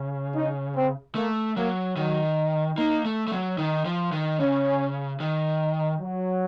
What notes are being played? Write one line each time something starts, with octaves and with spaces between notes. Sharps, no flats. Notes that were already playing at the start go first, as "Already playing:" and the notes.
Already playing: C#3
D#4
C4
A3 A#3
F#3 A#3
D#3 F#3
A#3 D#4
A3
A3
F#3
D#3 D#4
F3
D#3
C#3 C#4
D#3
F#3